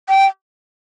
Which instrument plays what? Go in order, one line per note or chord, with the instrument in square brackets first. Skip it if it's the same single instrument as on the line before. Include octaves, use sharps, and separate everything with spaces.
[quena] G5